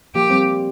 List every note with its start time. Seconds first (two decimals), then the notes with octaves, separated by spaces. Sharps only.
0.15 F3 A#3 G4
0.30 G3 C4